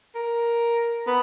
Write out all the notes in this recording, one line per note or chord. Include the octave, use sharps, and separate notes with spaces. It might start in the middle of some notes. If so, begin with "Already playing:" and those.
A#4
B3